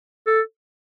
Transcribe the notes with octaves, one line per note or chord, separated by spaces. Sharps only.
A4